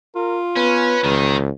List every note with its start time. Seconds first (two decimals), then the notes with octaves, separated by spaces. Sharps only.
0.16 F4 A#4
0.56 B3 C#4 B4
1.04 C#2 D#3